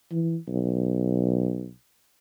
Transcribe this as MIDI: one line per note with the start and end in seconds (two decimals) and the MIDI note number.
0.12 0.37 52
0.48 1.72 35